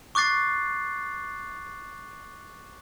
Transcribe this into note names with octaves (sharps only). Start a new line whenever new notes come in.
C#6 D6 F#6 A6 C7